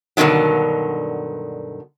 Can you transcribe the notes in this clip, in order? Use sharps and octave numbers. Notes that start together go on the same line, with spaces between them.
G2 B2 D3 D#3 F#3